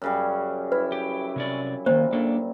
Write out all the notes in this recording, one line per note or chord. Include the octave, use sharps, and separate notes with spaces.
F#2 C#3 G3
E4 B4
G4
C3 C#4 D5
A#2 D#3 E3 A#3 C5
A#3 D4 A4